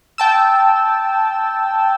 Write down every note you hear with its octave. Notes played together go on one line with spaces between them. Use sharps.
G5 A5 E6